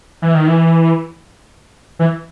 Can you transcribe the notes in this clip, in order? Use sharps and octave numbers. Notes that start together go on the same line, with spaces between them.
E3
D#3
E3
E3